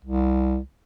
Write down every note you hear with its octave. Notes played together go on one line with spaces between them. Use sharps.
C2